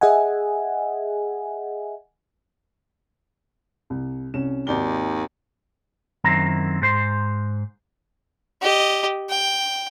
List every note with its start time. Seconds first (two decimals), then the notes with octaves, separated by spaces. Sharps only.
0.01 G#4 D#5 E5 F#5 G#5
3.90 C2
4.34 C2 C#4 E7
4.67 G#1 D#2 D5 G7
6.24 F#2 D#3 C4 E4 A#5
6.82 G#2 C5 C6
8.61 G4 D#5
9.29 G5